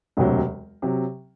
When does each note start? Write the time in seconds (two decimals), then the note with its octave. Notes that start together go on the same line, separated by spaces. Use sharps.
0.17 E1 D2 C3 F#3
0.82 C3 F#3